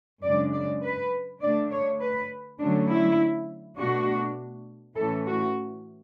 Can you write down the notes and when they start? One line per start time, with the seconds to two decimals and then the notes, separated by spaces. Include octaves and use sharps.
0.23 F#2 C#3 G#3 D4 D5
0.53 D5
0.83 B4
1.42 D3 A3 D4 D5
1.72 C#5
2.01 B4
2.60 D3 F#3 A3 C#4 D4
2.89 E4
3.78 B2 A3 D4 F#4
4.96 A2 E3 A3 C#4 A4
5.25 F#4